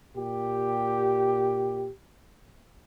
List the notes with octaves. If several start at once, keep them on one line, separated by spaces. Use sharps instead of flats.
A#2 G4